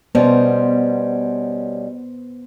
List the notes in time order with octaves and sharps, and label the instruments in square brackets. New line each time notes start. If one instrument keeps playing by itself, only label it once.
[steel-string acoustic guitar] B2 G3 C#4 [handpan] B3 C5